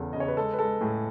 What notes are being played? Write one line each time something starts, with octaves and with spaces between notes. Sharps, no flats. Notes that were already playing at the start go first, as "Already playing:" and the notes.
Already playing: E2 C#3 A4
C#3 D#5
C#5
B4
G#3 A4
B4
G#3 A4
A2 G#4